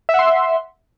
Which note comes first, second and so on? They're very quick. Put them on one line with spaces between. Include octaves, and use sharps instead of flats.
E5 F#5 C6